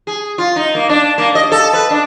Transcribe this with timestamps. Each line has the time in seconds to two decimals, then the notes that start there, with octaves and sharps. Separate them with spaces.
0.07 G#4
0.38 F4
0.56 D#4
0.75 A#3
0.89 D4
1.18 A#3
1.35 D#5
1.52 A4
1.73 B4
1.90 D4